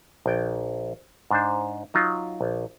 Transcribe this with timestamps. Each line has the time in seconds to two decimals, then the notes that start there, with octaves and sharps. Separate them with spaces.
0.26 A#1 G5
1.31 G#2 D4 C5
1.94 F#3 D#4 F4
2.41 A#1